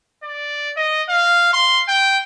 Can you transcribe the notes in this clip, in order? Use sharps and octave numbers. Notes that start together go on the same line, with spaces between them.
D5
D#5
F5
C6
G5